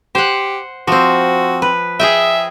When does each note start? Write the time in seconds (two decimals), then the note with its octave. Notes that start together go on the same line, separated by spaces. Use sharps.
0.15 G4 C5 F#5
0.87 F3 C4 F#4
1.62 B4
2.00 G#4 D#5 E5 G5